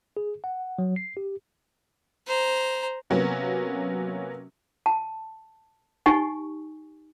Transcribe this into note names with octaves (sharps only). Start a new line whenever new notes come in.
G#4
F#5
F#3
C7
G4
C5 A#5
C3 F#3 A#3 B3 C#4
A5
D#4 G4 G#5 C#6